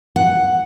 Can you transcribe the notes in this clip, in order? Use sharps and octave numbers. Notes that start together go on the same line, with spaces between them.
F#5